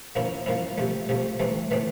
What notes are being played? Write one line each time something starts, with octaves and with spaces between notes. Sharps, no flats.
F3 A#3 C#4 E4
F3 A#3 C#4 E4
C3 F3 A3
C3 F3 A3
E3 A3 C4
E3 A3 C4